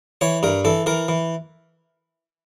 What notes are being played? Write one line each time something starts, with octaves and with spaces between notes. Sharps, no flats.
E3 C#5
G2 A#4
E3 A4
E3 A#4
E3